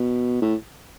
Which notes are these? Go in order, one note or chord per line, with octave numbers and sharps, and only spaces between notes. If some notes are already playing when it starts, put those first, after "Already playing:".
Already playing: B2
A2